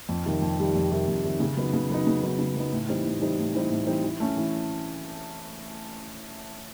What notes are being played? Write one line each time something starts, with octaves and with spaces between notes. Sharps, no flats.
F2
C3 D#3 G3
F2
C3 D#3 G3
F2
C3 D#3 G3
F2
C3 D#3 G3
C#3
F#3 B3 D#4
C#3
F#3 B3 D#4
C#3
F#3 B3 D#4
C#3
F#3 B3 D#4
A2
E3 G3 C4 D#4
A2
E3 G3 C4 D#4
A2
E3 G3 C4 D#4
A2
E3 G3 C4 D#4
E3
A3 C#4
E3